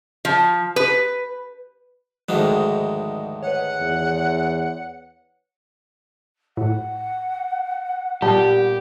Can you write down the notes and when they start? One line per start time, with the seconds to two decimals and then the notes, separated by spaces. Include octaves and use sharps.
0.25 F3
0.76 B4
2.29 D2 G#2 D#3 F3 G#3 D#6
3.42 B4 C#5 F#5
3.80 E2
6.57 A2 F#5
8.22 A#2 G3 B3 G4 A5